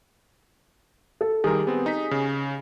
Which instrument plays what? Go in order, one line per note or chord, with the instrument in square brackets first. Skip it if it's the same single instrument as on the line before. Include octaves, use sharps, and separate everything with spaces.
[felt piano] A4
[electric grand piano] D#3 G3 A#4 [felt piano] G4 G#4
[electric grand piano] B3 C4
D#4 B6
C#3